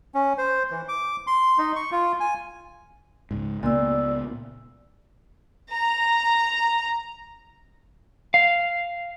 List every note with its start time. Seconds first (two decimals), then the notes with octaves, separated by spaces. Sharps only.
0.15 C#4
0.38 C5
0.71 E3
0.88 D6
1.27 C6
1.58 D#4
1.76 C#6
1.92 F4
2.20 G#5
3.31 C#2 G#2
3.63 C#2 A#2 B3 D5 E6
5.71 A#5
8.34 F5